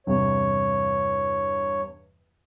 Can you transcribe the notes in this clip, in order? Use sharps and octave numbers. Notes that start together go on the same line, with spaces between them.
E2 G2 C3 C#5